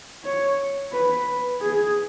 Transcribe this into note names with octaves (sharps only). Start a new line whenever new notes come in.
C#5
B4
G#4